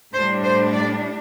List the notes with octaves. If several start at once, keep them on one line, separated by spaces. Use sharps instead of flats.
A2 G3 D4 C5
C5
D5